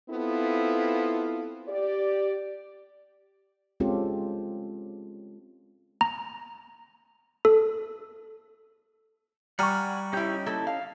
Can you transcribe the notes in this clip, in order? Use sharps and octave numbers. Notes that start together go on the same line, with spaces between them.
B3 C4 E4 F4 A4
G4 D5
G#3 C4 C#4 F4 G4 A4
A#5
A4
G3 F#5 G#5 A#5 C#6 F6
C#4 D#4 E4 G4 G6
A#3 E4 A4
F5